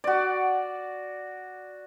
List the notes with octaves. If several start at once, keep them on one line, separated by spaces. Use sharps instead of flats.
F#4 D5